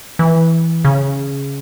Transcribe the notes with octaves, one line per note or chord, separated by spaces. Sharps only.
E3
C#3